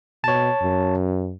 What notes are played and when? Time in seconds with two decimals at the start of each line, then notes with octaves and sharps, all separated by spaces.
0.24 B2 C#5 A5
0.62 F#2